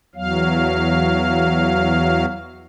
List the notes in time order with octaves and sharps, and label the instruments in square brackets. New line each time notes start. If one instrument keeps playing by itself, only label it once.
[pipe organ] E2 F#3 F5